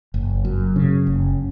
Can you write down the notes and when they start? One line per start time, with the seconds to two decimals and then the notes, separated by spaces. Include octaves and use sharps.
0.14 F#1
0.45 F#2
0.76 C#3
1.07 F#1